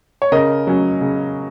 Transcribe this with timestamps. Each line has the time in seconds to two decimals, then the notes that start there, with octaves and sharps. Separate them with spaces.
0.22 C#5
0.32 C#3 A#4 D#5
0.67 F#3 C#4
1.01 C#3